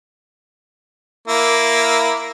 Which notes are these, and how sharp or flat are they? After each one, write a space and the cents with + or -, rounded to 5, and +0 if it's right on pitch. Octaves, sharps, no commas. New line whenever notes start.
A#3 +0 E4 +0